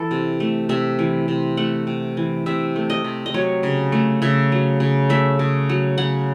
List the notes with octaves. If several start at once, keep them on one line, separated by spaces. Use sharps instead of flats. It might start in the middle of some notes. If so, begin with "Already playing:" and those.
Already playing: E3 A4
C3
A3
C3 E5
E3
C3
A3 F#5
C3
E3
C3 E5
A3
D#5
C3
D#5
F#3 C#5
C#3
A3
C#3 E5
F#3
C#3
A3 E5
C#3
F#3
C#3 F#5